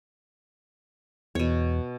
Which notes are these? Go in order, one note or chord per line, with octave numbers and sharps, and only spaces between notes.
E2 B2 C#5